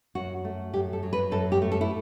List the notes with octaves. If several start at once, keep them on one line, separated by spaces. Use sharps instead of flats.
F#2 F#4
A3
F#2 G4
A4
F#3
B4
F#2 A4
G4
A3
A4
E4